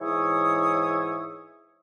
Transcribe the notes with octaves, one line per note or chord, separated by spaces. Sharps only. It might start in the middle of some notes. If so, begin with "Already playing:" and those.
G#2 E3 C#5 E5 D#6